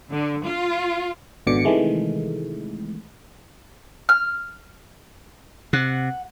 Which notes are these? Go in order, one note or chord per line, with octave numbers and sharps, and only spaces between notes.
D3
F4
G#1 B2 D3 D6 C#7
C3 D#3 E3 G#3 A3
F6
C3 F#5